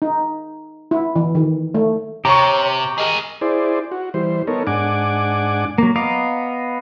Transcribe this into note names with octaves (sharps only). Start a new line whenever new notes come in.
D#4
E4
E3
D#3
A3
C3 G4 C#5 A#5 C#6
G#4 A#4 D#5
E4 G#4 C5 D5
F#4
E3 G3 C5
B3 D#4 A4 A#4 C#5
G#2 D4 F#5 G#5 D6
F#3 A#3
B3 D#5 F5 A#5 D6